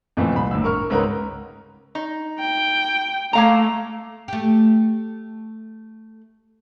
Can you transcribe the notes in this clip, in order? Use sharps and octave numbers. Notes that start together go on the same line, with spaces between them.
F2 A#2 E3 F3 A3 C4
C2 B5
G1 A2 E6
A#4 C#6 F6
C#2 G#2 A#4 B4 C#5 A#5
D#4
G5
A3 A#3 F5 A#5
A3 G4